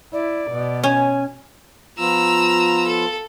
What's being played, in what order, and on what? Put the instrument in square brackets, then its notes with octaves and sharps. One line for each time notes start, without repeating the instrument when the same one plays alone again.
[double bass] E4 [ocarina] D5
[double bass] B2
[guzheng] C#4 [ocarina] G#5
[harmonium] F3 B3 F4 [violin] A#5 E6
[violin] A4